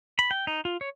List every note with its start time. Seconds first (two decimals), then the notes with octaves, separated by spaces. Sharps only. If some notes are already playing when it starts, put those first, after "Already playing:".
0.19 B5
0.31 G5
0.47 D#4
0.65 F4
0.81 C#5